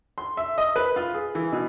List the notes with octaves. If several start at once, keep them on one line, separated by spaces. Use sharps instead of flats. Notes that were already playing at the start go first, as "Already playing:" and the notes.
C6
E5
D#5
B4
F4
G#4
E3
B2